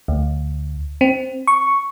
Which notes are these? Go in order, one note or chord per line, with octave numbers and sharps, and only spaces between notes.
D2
C4
C#6